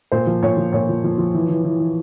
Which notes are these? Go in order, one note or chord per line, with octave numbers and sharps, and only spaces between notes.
A#2 C5
F3
A#2 C#5
F3
A#2 C#5
F3
F3
F3
E3
E3
E3
E3